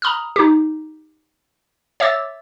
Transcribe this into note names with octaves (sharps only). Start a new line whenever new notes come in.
A#5 B5 D#6 F6
D#4 G4
C#5 E5 D6 E6 A6